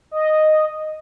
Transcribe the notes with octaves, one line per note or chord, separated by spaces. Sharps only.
D#5